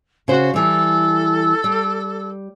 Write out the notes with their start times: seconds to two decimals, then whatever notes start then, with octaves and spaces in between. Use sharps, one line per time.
0.28 C#3 F#4 C5
0.54 E3 G3 A4
1.64 G3